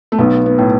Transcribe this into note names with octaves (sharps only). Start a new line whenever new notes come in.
A3
B1 B3
B3
A2